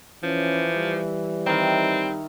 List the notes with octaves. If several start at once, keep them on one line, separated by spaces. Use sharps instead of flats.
E3 F3 C#4
G3
D#3 C4 E4 A#4